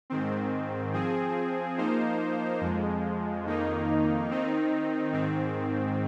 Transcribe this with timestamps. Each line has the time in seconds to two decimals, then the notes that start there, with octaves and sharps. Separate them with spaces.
0.10 G#2 D#3 C4
0.93 F3 C4 G#4
1.77 F3 A#3 D#4 C5
2.61 F2 F3 G#3
3.44 F2 D#3 A#3 D#4
4.29 D#3 C4 D#4
5.13 G#2 D#3 C4